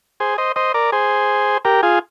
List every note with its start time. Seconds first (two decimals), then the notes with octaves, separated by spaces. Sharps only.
0.20 G#4 C5
0.38 C5 D#5
0.56 C5 D#5
0.74 A#4 D5
0.92 G#4 C5
1.65 G4 A#4
1.83 F4 G#4